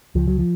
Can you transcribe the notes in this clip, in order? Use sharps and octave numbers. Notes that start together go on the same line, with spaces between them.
C#2 F3
F#3
F3